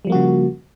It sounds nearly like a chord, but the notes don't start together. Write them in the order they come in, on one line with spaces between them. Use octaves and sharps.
G3 F3 A#3 F#4 C#3